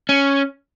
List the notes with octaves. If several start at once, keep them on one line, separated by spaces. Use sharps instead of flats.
C#4